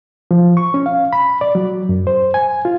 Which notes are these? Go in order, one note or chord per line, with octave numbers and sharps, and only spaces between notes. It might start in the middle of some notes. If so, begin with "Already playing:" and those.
F3
C#6
C#4
F5
B5
D5
F#3
F#2
C5
G#5
F4